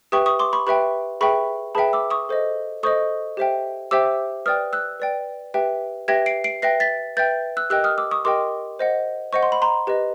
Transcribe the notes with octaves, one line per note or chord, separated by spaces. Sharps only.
G4 B4 E5 G5 C#6 D#6
C#6 D#6
C6 D6
B5 C#6
G4 B4 E5 G5 B5 C#6
G#4 B4 E5 G5 B5 C#6
G#4 B4 E5 G5 A5 B5
D6 E6
C#6 D#6
A4 C5 D#5
A4 C5 D#5 C#6 D#6
G4 C5 E5 G5
G4 C5 E5 G5 D6 E6
B4 D5 G5 D#6 F6
E6 F#6
B4 D5 G5
G4 B4 E5 G5
G4 B4 E5 G5 G#6 A#6
C7 D7
C7 D7
B4 E5 G5 A#6 C7
A6 B6
B4 E5 G5 G6 A6
E6 F#6
G4 A#4 D#5 G5 E6 F#6
D#6 F6
D6 E6
C#6 D#6
G4 A#4 D#5 G5 C6 D6
C5 D#5 F#5
C5 D#5 F#5 C#6
C6
B5
A#5 C6
G4 B4 D#5